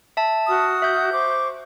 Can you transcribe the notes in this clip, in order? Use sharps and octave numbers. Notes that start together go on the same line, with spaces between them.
E5 A5
F#4 D#6 F6
E5 G6
C5 C#6 D6